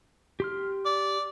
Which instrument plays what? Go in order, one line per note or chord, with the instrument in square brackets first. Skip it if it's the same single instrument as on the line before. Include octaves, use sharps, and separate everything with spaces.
[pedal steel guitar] G4 C6 F6
[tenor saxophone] D5